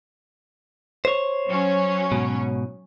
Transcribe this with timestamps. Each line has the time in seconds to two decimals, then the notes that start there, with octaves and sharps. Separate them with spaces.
1.05 C5 C#5
1.48 F#3 C#4
2.12 G#2 B2